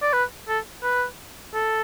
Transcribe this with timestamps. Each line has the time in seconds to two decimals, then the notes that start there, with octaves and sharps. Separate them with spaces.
0.02 D5
0.13 B4
0.48 A4
0.83 B4
1.54 A4